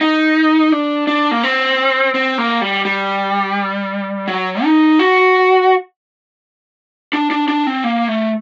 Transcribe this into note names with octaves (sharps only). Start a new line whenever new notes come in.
D#4
D4
D4
A#3
C4
C4
A#3
G3
G3
F#3
D#4
F#4
D4
D4
D4
C4
A#3
A3